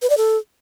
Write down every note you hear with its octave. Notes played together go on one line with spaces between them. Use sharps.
B4
D5
A4